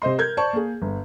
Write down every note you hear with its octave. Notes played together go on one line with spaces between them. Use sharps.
C3 C5 D#5 C6
A#4 G6 G#6
C5 D5 A5 C#6
A#3 G#4
G1